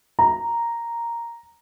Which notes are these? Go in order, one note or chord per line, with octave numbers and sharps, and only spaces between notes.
A#5